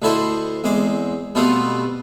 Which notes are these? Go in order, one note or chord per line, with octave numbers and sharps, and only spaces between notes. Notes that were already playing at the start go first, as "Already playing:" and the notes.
D2 D3 E4 A4 C5 D#5
E2 G#3 C4 D6
B2 G3 A3 B3 C4 F4